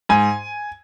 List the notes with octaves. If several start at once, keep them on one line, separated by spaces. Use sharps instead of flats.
G#2 G#5